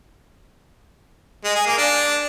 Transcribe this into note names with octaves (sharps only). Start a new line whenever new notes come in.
G#3
G#4
A#3
D4